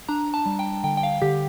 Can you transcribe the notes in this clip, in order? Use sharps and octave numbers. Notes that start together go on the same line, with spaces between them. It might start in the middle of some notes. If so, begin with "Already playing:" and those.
D4 A#5
A5
G3
G5
D3 G5
G5
F5
D3 G4